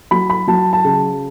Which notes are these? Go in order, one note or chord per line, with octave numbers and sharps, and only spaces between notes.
F#3 B5
B5
F#3 A5
A5
C#3